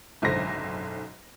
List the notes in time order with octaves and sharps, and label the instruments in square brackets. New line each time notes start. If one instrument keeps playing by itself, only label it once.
[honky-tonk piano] F#1 B1 G#2 D3 C5 A#6